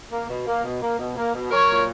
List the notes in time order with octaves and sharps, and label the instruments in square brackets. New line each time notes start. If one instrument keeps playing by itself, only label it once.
[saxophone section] A#3
B2
A#3
B2
A#3
B2
A#3
B2
F#3 A#4 C#5
A#2